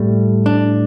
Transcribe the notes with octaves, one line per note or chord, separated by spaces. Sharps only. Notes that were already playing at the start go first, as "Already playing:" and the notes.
Already playing: A2 G3
D4